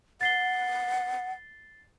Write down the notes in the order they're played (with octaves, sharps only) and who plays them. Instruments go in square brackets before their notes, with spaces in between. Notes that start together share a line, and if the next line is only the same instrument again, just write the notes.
[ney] F#5 [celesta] A6 C7 G7